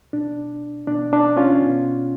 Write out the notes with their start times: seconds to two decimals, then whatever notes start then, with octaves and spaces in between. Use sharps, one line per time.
0.13 B2 D4
0.87 B2 D4
1.13 D4
1.37 C#4 F4
1.62 B2